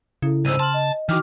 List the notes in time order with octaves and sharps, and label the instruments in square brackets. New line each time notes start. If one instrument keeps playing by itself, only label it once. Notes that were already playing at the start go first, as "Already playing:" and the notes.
[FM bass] C#3 [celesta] E4 A4
[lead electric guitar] C2 G#2 [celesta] C5 E6 D#7
[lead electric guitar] A5 [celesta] C6 F6 F#7
[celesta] D#5
[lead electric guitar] D#3 [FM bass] E3 [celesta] F#4 D6 F6